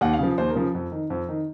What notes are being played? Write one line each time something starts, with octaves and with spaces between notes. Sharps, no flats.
D#2 F#5
F5
C#3 F3
D#2 C5
A#4
C#3 F3
F2
D#3
F2
D#3